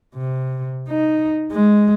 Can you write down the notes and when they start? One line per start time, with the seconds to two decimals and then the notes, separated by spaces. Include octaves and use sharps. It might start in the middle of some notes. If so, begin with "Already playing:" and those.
0.16 C3
0.89 D#4
1.52 G#3